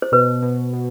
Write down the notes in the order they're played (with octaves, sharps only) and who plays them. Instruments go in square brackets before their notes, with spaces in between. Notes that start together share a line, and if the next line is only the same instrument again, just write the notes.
[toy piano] C5
[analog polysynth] B2 [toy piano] B4
[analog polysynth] B2
B2